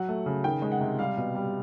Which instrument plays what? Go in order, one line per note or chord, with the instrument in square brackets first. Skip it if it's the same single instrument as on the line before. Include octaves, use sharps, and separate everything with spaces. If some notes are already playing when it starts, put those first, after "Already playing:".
Already playing: [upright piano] F#3 F#5
A3
C#3
D#3 G5
G#3
F#5
C3
G3 F5
B2
G3